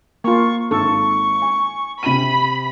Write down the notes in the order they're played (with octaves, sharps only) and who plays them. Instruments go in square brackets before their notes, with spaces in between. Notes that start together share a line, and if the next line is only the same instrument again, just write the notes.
[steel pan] A#3 F4 [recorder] C#6
[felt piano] G#1 [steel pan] A4 [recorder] C#6
[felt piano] G#5
[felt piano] C3 D#7 [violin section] B5